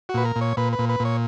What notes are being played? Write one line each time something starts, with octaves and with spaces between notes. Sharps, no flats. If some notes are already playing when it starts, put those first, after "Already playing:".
F#4
A#2 B4
A#4
A#2
C#5
A#2 B4
B4
A#2
B4
A#2
C#5